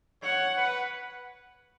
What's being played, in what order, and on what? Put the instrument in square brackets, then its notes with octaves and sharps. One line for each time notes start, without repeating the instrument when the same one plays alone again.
[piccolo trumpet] C#5 [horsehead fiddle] F#5
[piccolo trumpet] B4